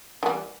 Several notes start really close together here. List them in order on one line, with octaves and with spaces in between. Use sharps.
E3 B3 G3